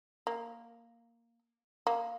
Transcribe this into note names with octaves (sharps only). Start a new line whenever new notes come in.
A#3
A#3